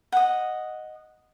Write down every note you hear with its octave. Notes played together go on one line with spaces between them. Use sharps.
D#5 F#5